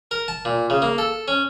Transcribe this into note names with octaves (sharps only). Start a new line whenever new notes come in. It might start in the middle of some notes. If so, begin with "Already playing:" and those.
A#4
A5
A#2
C#3
A#3
A4
C#4